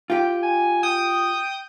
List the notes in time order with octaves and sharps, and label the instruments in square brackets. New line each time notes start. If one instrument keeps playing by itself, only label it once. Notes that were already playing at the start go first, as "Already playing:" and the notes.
[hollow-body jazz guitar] F4 G4 [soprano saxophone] G5
[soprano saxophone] G#5
[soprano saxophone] G5 [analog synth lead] D#6